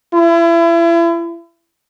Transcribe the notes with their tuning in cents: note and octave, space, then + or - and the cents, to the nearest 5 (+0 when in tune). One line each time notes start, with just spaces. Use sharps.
E4 +35